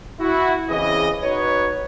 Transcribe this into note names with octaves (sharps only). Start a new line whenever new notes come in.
E4 F#4
C#3 E3 C4 G#4 D#5
D#4 F#4 B4 C#5